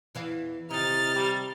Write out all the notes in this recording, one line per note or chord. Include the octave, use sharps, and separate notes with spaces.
E2 E3 F5
C3 D#3 D#4 E4 F6 A6
G3 G4